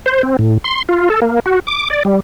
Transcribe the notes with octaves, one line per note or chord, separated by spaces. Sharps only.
C5
C4
A2
C6
F4
A4
A#3
F#4
D6
D5
G3